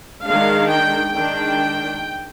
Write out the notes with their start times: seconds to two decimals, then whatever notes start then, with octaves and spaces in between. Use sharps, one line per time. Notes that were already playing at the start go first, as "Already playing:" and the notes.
0.24 D#3 G#3 D4 F5
0.70 G5
1.14 D#3 G#3 D4 G5